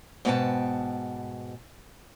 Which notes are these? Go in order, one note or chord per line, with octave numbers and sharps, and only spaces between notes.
G#2 B2 B3 E4 G5 A5